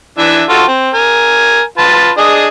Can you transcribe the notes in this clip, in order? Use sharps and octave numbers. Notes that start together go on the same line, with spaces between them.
E3 D4 E5
F4 F#4 A4
C4
A#4 G#5
F4 B4 A5
D4 G#4 D#5